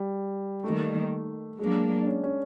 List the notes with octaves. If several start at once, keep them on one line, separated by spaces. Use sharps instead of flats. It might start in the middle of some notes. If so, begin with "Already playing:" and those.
Already playing: G3
D#3 G3 A3 A#3
F#3 G#3 A#3 D4
D4
C#4
C#4